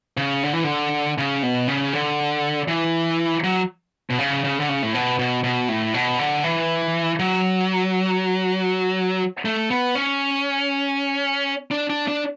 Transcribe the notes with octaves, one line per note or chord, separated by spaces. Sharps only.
C#3
D3
E3
D3
C#3
B2
C#3
D3
E3
F#3
B2
C#3
C#3
D3
C#3
A2
B2
B2
B2
A2
B2
D3
E3
F#3
A3
B3
C#4
D4
D4
D4